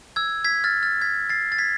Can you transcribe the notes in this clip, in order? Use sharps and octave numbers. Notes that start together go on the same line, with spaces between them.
E6 G#6
G#6 B6
F6 A6
F6 A6
G#6 B6
A6 C7
A6
G#6 B6